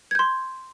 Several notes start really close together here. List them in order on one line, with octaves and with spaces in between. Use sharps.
G#6 G6 C6